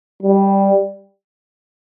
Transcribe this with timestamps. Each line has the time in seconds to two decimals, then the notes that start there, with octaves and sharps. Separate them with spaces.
0.23 G3